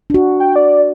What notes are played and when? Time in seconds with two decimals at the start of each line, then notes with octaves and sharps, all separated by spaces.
0.10 D4 F#4
0.40 G5
0.56 D5